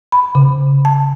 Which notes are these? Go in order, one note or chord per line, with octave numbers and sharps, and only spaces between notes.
B5
C#3
A5